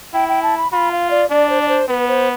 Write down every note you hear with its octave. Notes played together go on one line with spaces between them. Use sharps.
E4 G5
G5
A5
B5
F4 B5
F5
D5
D4 D5
C5
D5
C5
B3 B4
C5